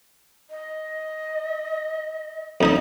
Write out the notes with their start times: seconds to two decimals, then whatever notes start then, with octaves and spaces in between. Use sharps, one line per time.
0.50 D#5
2.61 F2 D#4 D#5